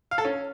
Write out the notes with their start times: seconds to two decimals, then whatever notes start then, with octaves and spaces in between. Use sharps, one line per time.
0.11 F5
0.18 A4
0.25 C#4